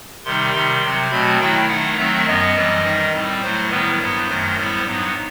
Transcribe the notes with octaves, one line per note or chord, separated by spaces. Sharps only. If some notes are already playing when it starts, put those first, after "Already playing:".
C3 D#3 G3 D#4 C6
C3 D#3 G3 C6
C3 F#3 C4
B2 F#3 A3 C4 B5
D#3 F#3 A3 E4 G5
D#3 F#3 A3 D#4 F#5
D#3 F#3 A3 C4 E5
F#2 F#3 B3 D#5
F#2 E3 G3 C4
D#3 G3 D#4
A2 G3 C4
A2 F#3 A3 C5
D#3 G3 B3 E4 B4
G2 F#3 B3 E4 C5
F#2 D#3 F#3 A3
A2 G3 B3 E4
G2 F#3 B3 D#4